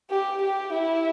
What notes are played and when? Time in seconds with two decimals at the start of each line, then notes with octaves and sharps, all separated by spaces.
0.11 G4
0.42 G4
0.73 E4